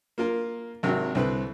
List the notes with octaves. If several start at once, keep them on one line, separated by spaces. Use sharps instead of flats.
A#3 F4 A#4
G#1 C3 F#3 A#4
C2 D3 C4 B4